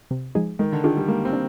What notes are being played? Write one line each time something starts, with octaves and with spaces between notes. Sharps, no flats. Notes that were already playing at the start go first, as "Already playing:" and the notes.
C3
F3 G#3 D#4 G#4
D#3 G#3
D3
D#3 D4 F4 G#4
G3
G#3 A#3
C4
D4